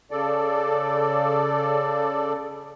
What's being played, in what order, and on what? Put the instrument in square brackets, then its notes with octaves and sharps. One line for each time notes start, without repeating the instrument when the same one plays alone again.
[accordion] C#3 A4 D5